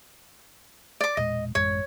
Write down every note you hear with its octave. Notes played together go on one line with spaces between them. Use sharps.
D5 D6
E1 A#2 G#3 D#5
A1 F#2 G#3 C#5